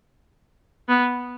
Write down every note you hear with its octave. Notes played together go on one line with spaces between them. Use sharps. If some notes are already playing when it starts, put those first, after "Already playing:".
B3